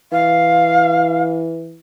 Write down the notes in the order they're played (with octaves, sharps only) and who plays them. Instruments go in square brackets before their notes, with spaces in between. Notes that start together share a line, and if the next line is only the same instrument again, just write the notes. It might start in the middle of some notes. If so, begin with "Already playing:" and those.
[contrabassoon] E3 [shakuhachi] F5